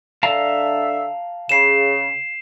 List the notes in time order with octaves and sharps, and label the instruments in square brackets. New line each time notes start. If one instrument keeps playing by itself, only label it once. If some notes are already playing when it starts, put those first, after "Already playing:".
[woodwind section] D3 D4 E5 [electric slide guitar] F5 A5 A#5
[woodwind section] C#3 [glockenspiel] C7 E7